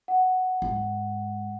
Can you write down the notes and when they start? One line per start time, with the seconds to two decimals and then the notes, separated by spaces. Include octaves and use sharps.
0.08 F#5
0.62 G#2